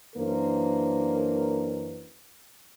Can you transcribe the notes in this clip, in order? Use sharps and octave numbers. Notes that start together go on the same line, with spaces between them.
F#2 E3 A#3 D4 A#4 C5